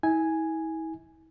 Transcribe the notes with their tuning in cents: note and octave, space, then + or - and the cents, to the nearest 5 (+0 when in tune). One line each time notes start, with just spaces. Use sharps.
E4 -40 G#5 +0